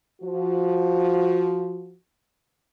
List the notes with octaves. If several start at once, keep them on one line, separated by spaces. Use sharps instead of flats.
F3 F#4